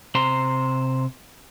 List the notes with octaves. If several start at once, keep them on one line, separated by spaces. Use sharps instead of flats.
C3 C5 A#5 C6